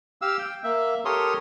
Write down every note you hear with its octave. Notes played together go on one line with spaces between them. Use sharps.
G4 F5 E6
G5
A#3 E5
G4 A4 A#4 C#5 C6 D#6